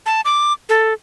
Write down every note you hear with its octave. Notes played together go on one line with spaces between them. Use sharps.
A5
D6
A4